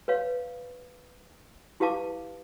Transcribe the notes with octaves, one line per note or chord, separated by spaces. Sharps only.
B4 C#5 F5
E4 G4 B4 F5 A5 D6